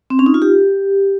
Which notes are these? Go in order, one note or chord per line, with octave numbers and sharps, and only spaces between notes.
C4
C#4
D#4
F4
G4